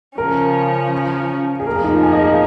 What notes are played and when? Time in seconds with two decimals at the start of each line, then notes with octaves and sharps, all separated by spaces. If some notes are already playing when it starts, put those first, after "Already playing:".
0.18 C#3 F3 C#4 A#4
1.60 G#4
1.66 F2 F3 A#3 A#4
1.76 G#4
1.84 D#4
1.94 F4
2.03 G#5
2.12 D#5
2.22 G#4
2.31 F4